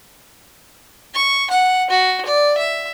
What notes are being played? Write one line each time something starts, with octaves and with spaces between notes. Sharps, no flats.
C#6
F#5
F#4
D5
E5